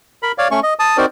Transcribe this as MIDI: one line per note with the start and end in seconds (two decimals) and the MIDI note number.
0.23 0.32 70
0.23 0.32 83
0.38 0.48 73
0.38 0.48 74
0.38 0.48 77
0.51 0.60 57
0.51 0.60 61
0.51 0.60 85
0.63 0.74 75
0.79 0.97 81
0.79 0.97 87
0.97 1.06 60
0.97 1.06 63
0.97 1.06 66
0.97 1.06 70
0.97 1.06 72
0.97 1.06 74